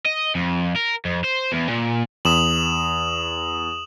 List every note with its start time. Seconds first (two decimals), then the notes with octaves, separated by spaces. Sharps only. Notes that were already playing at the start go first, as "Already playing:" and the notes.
0.06 D#5
0.35 F2
0.76 A#4
1.05 F2
1.24 C5
1.52 E2
1.69 A#2
2.25 E2 D#6 E7 F#7